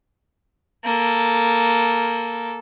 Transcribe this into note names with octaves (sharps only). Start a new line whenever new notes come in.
A#3 A4